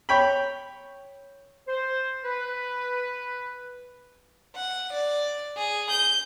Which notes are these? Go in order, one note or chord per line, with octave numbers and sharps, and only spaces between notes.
C#5 G5 B5
C5
B4
F#5
D5
G#4
G6